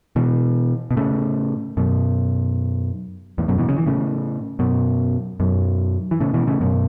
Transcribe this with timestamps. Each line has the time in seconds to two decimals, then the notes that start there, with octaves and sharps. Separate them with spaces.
0.16 B2 E3
0.91 B2
0.97 A2 C#3
1.77 F#2 B2
3.38 E2 A2
3.48 F#2 B2
3.58 B2 E3
3.69 C#3
3.78 E3
3.87 A2 C#3
4.59 F#2 B2
5.40 F#2 B2
6.11 E3
6.21 A2 C#3
6.34 B2 E3
6.47 A2 C#3
6.61 F#2 B2